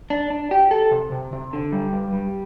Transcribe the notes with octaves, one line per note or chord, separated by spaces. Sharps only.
D4
D4
G4
A4
C3
C3
C3
D3
G3
G2
G3